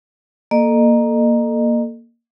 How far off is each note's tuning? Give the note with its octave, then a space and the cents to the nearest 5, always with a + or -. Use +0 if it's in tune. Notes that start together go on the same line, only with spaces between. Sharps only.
A#3 +5 A4 +0 D#5 -35